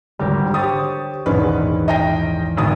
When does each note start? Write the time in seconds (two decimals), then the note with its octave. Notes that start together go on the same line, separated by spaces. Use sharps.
0.19 G#1 D3 G3 G4 A#4
0.54 G4 C5 C#5 D#6 A6 C#7
1.26 A#1 E2 G#2 B2 D#3 C#4 B4
1.88 D#5 G5 A#6
2.57 D#1 G#1 G2 D3 B3 D#6